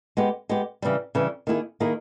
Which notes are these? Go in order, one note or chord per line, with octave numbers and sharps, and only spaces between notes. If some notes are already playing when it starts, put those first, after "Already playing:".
G#3 B3 G4
G#3 B3 G4
C#3 E3 G3
C#3 E3 G3
D#3 A#3 E4 G#4
D#3 A#3 E4 G#4